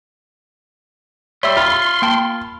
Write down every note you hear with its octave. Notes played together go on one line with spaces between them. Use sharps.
G3 C#5 E5 C6 E6
F4 B5
A#3 G5 A5